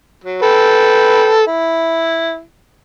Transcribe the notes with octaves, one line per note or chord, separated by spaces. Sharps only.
F#3
A4 B4 G5
E4